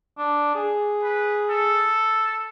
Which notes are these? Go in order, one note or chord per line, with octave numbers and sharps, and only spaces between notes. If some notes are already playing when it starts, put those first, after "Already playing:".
D4
G#4
B4
A4